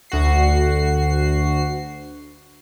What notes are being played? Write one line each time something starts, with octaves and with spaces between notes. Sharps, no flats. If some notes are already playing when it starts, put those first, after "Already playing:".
D2 F#4 C7